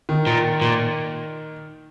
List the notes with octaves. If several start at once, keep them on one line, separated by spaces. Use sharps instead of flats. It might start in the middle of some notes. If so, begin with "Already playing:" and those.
D#3
A#2
A#2